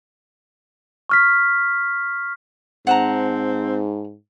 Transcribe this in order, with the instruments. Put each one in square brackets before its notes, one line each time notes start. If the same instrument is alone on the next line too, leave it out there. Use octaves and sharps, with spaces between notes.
[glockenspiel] C#6 F6 B6
[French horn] G#2 [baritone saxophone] C4 [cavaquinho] F#5 A5 A#5